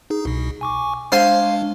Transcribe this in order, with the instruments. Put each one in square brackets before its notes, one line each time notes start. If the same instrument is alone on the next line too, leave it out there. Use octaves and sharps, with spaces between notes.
[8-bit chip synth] D#4 G#4
C2 B2
G#5 C#6 D6
[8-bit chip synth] G#3 D4 [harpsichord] C5 F5 G#5